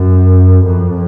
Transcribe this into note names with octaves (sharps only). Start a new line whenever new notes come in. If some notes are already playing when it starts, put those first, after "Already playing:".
Already playing: F#2
F2